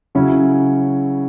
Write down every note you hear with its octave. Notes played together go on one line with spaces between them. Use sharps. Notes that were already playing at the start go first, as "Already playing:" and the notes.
C#3 F#3 C#4 E4